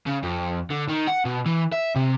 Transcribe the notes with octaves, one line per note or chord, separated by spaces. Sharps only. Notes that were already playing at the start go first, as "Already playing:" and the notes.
C#3
F2
D3
D#3
F#5
B2
E3
E5
C3